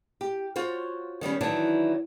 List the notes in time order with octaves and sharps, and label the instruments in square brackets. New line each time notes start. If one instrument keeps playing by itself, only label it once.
[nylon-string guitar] G4
F4 F#4 C5 C#5
D#3 G3 B3 C#4
D#3 E3 F#3 D4